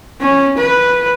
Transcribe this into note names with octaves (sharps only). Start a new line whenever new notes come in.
C#4
B4